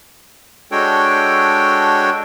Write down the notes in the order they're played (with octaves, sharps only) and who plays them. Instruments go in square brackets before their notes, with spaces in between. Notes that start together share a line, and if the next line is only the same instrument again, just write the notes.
[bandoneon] G#3 D4 F#4 A4 C#5 G5